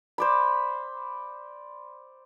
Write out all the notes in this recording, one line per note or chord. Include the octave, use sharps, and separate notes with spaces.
C5 D5 B5